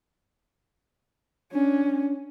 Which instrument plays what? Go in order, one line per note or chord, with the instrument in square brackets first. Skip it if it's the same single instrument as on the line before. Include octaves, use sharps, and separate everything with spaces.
[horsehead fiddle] C#4 [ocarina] D4